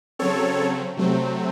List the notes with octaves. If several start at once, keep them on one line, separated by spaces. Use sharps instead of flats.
C#3 F#3 C4 A4 C#5
C3 F#3 A3 C4